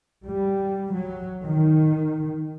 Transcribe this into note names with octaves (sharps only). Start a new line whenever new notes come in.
G3
F#3
D#3